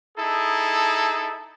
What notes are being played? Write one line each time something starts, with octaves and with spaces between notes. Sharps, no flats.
D#4 E4 G#4 A4